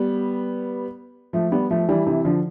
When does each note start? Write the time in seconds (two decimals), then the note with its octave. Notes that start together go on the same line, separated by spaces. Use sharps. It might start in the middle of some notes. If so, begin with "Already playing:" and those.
Already playing: G3 B3
1.33 F3 A3
1.52 G3 B3
1.71 F3 A3
1.89 E3 G3
2.06 C3 E3
2.25 D3 F3